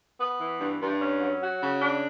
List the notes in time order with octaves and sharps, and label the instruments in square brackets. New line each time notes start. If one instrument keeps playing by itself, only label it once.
[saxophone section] B3
E3
G2
G2
C#4
F#3
F#4
C#3
D4